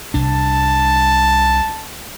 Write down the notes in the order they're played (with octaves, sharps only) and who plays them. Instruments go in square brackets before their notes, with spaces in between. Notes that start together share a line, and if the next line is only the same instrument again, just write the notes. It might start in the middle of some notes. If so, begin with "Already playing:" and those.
[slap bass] C2 D4 [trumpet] A5